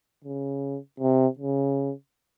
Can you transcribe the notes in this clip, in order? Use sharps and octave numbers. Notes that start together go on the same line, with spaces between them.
C#3
C3
C#3